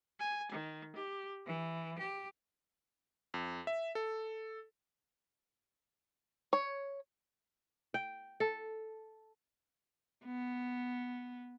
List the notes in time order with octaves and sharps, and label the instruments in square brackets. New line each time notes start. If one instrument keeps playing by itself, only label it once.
[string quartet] G#5
D#3
G4
E3
G4
[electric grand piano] F2
E5
A4
[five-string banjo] C#5
[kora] G5
A4
[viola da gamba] B3